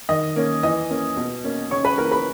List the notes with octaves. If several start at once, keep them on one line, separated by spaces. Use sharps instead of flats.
D#3 D#5 D#6
A#3 C#4
E3 D#5 D#6
A#3 C#4
B2
A#3 C#4
C#3 C#5 C#6
B4 B5
E3 A#3 A#4 A#5
B4 B5